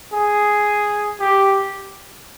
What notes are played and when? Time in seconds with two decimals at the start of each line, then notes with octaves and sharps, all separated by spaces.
0.13 G#4
1.20 G4